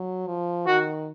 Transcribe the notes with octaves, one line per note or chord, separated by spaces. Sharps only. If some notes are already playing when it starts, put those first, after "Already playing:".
Already playing: F#3
F3
D#3 F#4